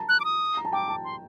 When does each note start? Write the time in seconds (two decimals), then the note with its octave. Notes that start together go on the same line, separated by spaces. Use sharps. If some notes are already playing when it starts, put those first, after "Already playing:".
Already playing: A5 A#5
0.09 F#6
0.20 D6
0.25 D#6
0.57 A#5
0.65 A5
0.73 G5 D6
0.88 A5
1.04 C6